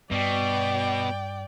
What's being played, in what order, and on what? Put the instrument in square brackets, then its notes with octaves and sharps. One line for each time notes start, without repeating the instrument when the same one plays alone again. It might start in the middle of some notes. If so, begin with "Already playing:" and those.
[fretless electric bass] G2 [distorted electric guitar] B2 [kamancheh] D5 G5